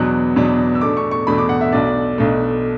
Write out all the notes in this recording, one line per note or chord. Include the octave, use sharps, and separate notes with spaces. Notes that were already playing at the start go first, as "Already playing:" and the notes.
Already playing: E2 B2 F#3 B3 D4 F#6
E2 B2 F#3 B3 D4
E6
E2 B2 A3 D4 D6
C#6
C#6
E2 B2 A3 D4 B5
D6
F#5
E5
B1 B2 A3 D4 D5
B1 B2 A3 D4